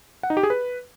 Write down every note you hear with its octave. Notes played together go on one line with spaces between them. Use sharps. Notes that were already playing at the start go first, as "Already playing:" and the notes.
F#5
D#4
G4
G#4
B4